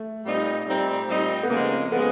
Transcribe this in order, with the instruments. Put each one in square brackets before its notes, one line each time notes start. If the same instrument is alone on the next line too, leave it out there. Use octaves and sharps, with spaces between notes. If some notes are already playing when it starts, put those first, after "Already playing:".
Already playing: [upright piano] A3
[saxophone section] A#2 G3 C4 D#4
[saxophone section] A#2 G3 C4 D#4 [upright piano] A3
[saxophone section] A#2 G3 C4 D#4
[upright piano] B3
[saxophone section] C#3 F3 G#3 [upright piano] A#3
[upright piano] C4
[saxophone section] C#3 F3 G#3 [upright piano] B3